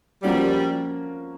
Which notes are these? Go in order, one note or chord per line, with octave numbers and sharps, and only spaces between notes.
F3 G3 A#3 C#4 F#4